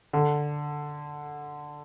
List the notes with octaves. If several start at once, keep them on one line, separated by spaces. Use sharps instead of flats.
D3